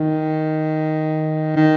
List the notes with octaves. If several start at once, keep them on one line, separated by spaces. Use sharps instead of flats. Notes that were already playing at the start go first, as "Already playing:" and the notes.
Already playing: D#3
D#3